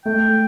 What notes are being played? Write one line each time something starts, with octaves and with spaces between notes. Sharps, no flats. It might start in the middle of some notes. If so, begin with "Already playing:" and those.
A3 G5